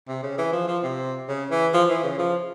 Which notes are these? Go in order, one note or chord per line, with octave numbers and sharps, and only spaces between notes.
C3
C#3
E3
F3
F3
C3
C#3
E3
F3
E3
C#3
F3